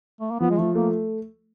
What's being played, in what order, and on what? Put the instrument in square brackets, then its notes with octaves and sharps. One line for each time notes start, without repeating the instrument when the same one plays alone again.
[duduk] A3
A#3
[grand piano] F3 [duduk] B3
[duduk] G#3
[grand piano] F3 [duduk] A3
[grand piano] A3 [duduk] A#3